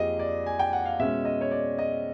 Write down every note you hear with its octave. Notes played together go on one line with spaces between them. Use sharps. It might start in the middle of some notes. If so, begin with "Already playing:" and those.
Already playing: F2 F3 A#3 G4 G#4 D#5
D5
G#5
G5
F#5
F5
B2 G#3 C#4 E5
D#5
C#5
D5
D#5